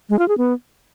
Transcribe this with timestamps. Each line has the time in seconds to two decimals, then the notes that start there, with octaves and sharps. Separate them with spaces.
0.10 G#3
0.19 F4
0.28 G#4
0.38 B3